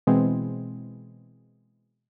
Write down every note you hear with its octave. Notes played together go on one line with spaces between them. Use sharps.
B2 E3 G#3 C4